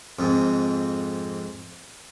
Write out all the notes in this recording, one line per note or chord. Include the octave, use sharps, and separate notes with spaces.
F2 G#2